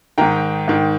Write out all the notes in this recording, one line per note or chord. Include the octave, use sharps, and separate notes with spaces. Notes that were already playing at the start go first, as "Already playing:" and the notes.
G#2 D#3 G5 A#5
G#2 D#3